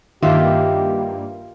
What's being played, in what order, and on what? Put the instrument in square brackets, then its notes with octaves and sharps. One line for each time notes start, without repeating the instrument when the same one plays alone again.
[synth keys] G2 G3 A#3 [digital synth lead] D#3 [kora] F4 E5 [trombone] G4